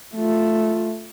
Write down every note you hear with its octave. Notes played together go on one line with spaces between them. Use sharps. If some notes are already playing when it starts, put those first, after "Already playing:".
A3 F4